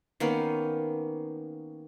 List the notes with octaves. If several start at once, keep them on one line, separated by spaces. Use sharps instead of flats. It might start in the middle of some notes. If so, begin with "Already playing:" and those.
D#3 A#3 B3 C#4